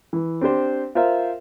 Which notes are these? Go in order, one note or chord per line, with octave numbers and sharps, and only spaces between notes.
E3
C4 D4 G4 C5
F4 A#4 C5 E5 F5